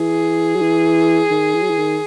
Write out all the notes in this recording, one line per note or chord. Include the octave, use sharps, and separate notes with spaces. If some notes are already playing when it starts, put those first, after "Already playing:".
Already playing: E3 G#4
F#3
E3
D#3
E3
F#3
E3
D#3